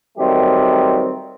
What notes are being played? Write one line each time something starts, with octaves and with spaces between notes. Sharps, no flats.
D#3 F#3 G3 A3 C4 G4